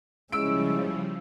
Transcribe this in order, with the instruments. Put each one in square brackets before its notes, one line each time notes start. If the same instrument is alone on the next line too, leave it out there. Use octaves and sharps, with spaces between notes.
[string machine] C#3 F3 G3 [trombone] G#3 [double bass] C#4 E4 [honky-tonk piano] E6 D7